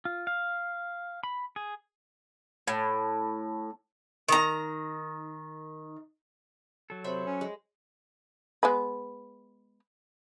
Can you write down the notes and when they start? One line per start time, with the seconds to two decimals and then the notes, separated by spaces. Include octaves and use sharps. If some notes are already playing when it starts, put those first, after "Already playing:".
0.05 F4
0.27 F5
1.23 B5
1.56 G#4
2.67 A2
4.29 D#3 A#5
6.90 F#3 A4
7.04 C3 C5 C#5 E5 B5
7.26 C#4
7.41 G#3
8.63 G#3 B3 B4